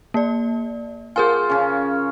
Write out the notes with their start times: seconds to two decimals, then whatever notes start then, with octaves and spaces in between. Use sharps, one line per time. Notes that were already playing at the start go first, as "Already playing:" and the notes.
0.14 A#3 D5
1.16 F4 G#4 A#4 C5 G#5
1.50 C#3 C#4